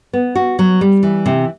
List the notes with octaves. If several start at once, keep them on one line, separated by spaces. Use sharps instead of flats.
B3
F#4
F#3
G3
E3
C3